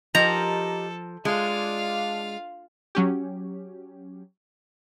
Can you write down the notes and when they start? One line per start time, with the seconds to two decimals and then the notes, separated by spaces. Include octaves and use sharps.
0.15 F3 D#4 G4 A4 A#4 A#5
1.25 G#3 D4 F4 F5
2.95 F#3 C#4 G4